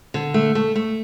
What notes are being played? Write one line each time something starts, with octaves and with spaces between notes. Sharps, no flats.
D3
A3
A3
A3